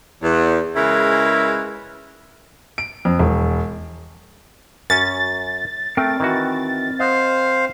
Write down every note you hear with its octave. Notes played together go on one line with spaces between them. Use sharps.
E2
C#3 G#3 E4 A#4 B4
D7
F2
E1
F#2 C#4 A6
A3 C4 A#4 G5
D#3 E3 F#4
C5 D#5 F5 F#5